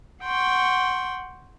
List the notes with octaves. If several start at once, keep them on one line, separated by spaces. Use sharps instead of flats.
F#5 G5 C6 C#6